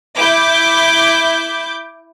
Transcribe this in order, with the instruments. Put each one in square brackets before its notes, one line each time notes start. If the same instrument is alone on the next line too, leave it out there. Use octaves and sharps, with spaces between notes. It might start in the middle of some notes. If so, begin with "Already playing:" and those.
[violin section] E4 D6 G6